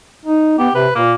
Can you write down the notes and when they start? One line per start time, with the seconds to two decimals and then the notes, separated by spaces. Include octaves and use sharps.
0.25 D#4
0.59 B3 G4
0.75 C3 B4
0.95 A#2 A#3